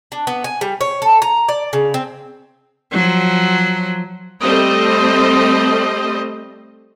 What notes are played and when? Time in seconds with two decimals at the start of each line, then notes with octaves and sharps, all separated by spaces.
0.12 D4
0.27 B3
0.44 G#5
0.61 G3
0.81 C#5
1.02 A4
1.22 A#5
1.49 D5
1.73 C#3
1.94 C4
2.92 F3 F#3
4.42 G3 A3 C4 C5 D#5